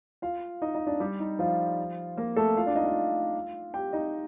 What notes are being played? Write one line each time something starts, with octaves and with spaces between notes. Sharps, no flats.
F4 F5
D#4 D#5
D#4 D#5
D4 D5
G3 G4
D#4
F3 F4
A#3 A#4
A3 A4
F4 F5
D4 D5
D#4 D#5
F4 F5
G4 G5
D#4 D#5